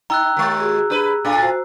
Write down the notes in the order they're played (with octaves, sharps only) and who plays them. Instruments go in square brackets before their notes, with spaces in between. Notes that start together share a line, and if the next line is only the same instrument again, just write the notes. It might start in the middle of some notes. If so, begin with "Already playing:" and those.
[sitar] D#4 [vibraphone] G5 [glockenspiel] A#5 E6 F#6
[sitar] D#2 G#3
[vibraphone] F#4 G#4
[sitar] D4 B4 [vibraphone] G4 G#4
[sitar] A2 D4 F4 [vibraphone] A4 G#5 A5
[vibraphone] F#4 C5